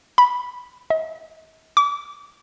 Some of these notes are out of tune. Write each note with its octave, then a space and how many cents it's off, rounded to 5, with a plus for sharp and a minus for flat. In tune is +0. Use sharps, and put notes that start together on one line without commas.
B5 -5
D#5 +45
D6 -30